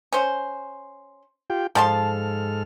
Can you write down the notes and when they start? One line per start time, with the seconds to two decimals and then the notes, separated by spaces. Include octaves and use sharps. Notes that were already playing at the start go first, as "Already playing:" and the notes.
0.13 C#4 C5
1.50 F4 G4 G5
1.75 G#2 F3 A4 A5 C6 F6